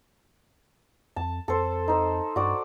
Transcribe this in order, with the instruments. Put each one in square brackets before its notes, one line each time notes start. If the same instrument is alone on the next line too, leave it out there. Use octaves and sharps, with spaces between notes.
[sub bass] F2 [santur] A5
[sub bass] F2 [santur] A4 C5
[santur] D#4 C5
[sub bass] G2 [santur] F#4 D5